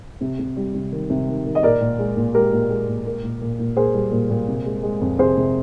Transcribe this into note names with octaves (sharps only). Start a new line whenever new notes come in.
C3
C3
G3
C3
D#3
C3
D#3
D#3
D#5
A#2 A#4 D5
A#2
G#3
A#2
G#3 G4 A#4
A#2
G#3
A#2
A#3
A#2
A#2
A#2
A#3 G#4 C5
G3
A#2
A#2
C3
G#3
G#3
F2
C3 G#4 C5
C3